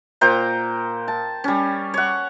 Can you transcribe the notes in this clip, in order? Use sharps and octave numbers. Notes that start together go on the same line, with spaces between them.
A#2 C5 G5 A#5
A5
G3 C#4
C#5 F#5